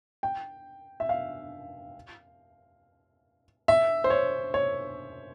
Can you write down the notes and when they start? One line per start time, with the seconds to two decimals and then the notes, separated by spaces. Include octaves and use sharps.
0.23 G5
1.00 E5
1.09 F5
3.68 E5
4.04 C5
4.10 C#5
4.54 C#5